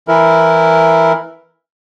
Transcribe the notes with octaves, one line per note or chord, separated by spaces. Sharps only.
E3 E4 A#4